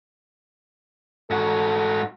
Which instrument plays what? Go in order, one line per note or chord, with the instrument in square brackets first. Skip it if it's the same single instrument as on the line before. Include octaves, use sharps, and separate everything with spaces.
[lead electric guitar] G#2 F#4 [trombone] A4